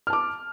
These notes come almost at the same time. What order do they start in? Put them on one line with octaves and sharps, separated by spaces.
F6 A5 D6